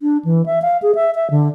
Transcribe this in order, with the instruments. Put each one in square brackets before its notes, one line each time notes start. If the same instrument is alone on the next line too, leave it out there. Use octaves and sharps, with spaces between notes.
[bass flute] D4
E3
E5
F5
G#4
E5
E5
D3